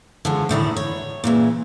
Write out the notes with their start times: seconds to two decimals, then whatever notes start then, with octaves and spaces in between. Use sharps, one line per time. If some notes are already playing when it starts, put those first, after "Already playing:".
0.25 D3 F3 G#3 C#4
0.49 A2 D3 D#3 E4
0.77 C#5
1.24 A#2 C#3 E3